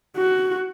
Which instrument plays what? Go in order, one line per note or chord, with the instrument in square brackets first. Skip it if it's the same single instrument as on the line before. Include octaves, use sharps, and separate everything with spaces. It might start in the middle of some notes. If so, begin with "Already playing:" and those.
[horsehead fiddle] F#4